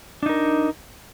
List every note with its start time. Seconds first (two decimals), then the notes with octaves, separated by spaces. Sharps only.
0.23 D4
0.26 D#4
0.29 A#4